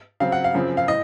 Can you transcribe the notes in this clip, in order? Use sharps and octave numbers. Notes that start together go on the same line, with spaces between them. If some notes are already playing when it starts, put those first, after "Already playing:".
C#3 F#3 C4 F5
F#5
F5
F#2 C#3 F3 C4
F5
A2 D#5